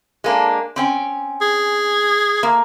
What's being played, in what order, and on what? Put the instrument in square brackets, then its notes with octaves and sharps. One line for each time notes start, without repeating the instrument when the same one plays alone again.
[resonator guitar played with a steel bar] G#3 A#3 D4
C4 C#4 G5
[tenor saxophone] G#4
[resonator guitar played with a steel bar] A#3